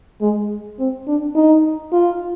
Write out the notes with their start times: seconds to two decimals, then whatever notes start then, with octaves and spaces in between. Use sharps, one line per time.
0.21 G#3
0.79 C4
1.07 D4
1.35 D#4
1.93 F4